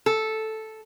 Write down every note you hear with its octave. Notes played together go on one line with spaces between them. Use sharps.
A4